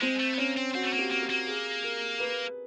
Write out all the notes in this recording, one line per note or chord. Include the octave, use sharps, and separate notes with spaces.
G#3 C4
A3
B3
A#3 C#4
C4
C4 F#4
A3
A#3
G4
A#3
G4
A#3
G#4
A#4
B4